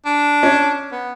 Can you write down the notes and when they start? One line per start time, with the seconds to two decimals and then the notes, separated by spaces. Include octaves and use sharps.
0.05 D4
0.43 C#4
0.92 B3